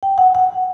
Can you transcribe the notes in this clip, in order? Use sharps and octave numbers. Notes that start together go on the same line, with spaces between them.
G5
F#5
F#5